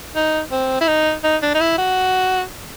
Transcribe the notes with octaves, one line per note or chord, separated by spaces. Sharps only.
D#4
C4
E4
D#4
D#4
D4
D#4
E4
F#4